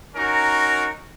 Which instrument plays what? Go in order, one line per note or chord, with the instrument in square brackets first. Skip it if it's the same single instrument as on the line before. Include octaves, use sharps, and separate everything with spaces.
[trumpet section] C#4 D#4 F#4 A#4